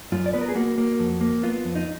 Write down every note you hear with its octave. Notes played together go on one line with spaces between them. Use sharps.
F#2 F4
D5
B3 B4
A#4
G#4
A#3 F#4
A#3
F2
A#3
B3 F4
F2
D#4